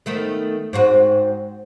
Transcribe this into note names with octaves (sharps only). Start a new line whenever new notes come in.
D#3 A3 B3
G#2 C4 F#4